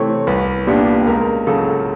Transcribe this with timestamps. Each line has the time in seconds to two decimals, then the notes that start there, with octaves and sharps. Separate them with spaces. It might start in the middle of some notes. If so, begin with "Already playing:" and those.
Already playing: C3 E3 A3 C4 C#5
0.27 C2 B4
0.67 A#2 G3 B3 D4
1.07 C#2 A#4
1.47 C#3 F#3 A4